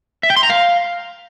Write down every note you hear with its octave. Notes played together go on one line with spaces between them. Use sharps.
E5
G5
C6
A#5
F5